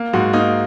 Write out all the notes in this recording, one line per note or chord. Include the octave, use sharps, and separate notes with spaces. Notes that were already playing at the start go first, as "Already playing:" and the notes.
Already playing: A#3
G#2 F#4
A#3 D#4